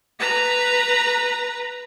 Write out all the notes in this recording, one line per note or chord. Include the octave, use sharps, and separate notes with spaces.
B4 A#5